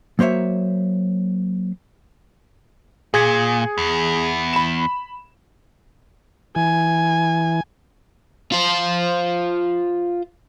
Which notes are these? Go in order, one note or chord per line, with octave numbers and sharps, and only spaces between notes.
F#3 A#3 C5 C#5 E5
A#2 G#4 G#6 C#7
E2
B5 E7
E3 G#5
F4 C5